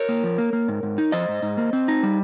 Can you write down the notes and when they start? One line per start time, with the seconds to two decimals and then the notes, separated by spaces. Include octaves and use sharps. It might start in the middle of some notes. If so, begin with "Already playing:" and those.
Already playing: A#4 C#5
0.09 A#3
0.23 F3
0.38 A#3
0.53 A#3
0.68 G#2
0.83 G#2
0.98 D#4
1.12 F3 C5 D#5
1.28 G#2
1.42 G#2
1.57 A#3
1.73 C4
1.88 D#4
2.03 G3